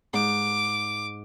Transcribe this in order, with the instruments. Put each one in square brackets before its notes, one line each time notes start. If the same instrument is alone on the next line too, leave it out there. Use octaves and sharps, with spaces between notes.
[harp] G#2 [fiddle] D6